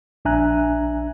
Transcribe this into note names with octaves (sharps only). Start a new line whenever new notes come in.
A#1 D4 E5 G#5 A#5 F#6